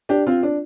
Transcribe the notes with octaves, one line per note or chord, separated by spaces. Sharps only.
D4 G4
C4 F4
D4